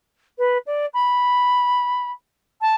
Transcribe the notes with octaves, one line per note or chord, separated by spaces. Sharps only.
B4
D5
B5
A5